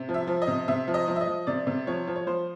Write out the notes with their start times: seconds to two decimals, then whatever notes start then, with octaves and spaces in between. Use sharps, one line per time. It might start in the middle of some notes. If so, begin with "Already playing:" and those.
Already playing: C3
0.09 F3
0.14 E5
0.28 F3
0.42 D#5
0.48 C3
0.68 C3 E5
0.88 F3
0.94 D#5
1.08 F3
1.16 E5
1.21 D#5
1.28 F3
1.47 C3 D5
1.67 C3
1.87 F3 C#5
2.07 F3
2.16 C#5
2.27 F3 C5